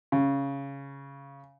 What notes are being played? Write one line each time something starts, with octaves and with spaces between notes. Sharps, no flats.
C#3